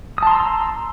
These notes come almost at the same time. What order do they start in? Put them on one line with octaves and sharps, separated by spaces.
D#6 A5 C6 A#5 E6